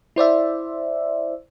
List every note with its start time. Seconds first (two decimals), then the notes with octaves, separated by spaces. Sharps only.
0.16 E4 C5 D5 E5